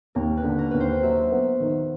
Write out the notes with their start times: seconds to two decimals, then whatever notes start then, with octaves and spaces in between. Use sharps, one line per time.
0.15 D#2 A#4
0.37 B4
0.44 D3
0.59 A#4
0.71 D#2 B4
0.80 C5
1.03 F#3 E5
1.31 B3
1.60 D#3